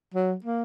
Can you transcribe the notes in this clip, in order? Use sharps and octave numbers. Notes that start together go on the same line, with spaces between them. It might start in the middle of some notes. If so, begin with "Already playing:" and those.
F#3
A#3